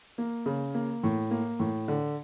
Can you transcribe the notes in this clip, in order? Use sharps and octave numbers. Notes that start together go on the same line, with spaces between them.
A#3
C#3
A#3
A2
A#3
A2
D3